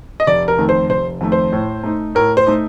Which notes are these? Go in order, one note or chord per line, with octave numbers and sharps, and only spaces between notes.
D#5
F1 D5
A#4
F2 D#3 A3
C5
F1 C5
F2 D#3 A3
C5
A2
A3 D#4
A2 A#4
C5
A3 D#4